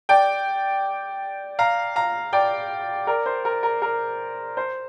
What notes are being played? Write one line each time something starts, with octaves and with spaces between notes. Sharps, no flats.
D5 G5
F5 A#5
F5 A#5
D5 G5
A#4 D5
C5
A#4
A#4
A#4
C5